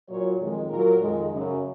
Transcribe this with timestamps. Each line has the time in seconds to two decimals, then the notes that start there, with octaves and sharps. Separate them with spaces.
0.08 A#2 F#3 C#5
0.40 F2 D#3 G#3
0.70 A#2 F#3 A#4
1.01 F2 D#3 G#3
1.32 F#2 C#3 F#3